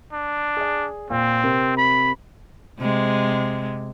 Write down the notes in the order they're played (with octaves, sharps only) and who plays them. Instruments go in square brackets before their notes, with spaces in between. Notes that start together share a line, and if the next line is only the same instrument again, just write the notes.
[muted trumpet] D4
[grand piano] G#4 D5
[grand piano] A#2 A#3 [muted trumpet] C4
[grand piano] C3 A#4 C5
[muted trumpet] B5
[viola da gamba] C3 G#3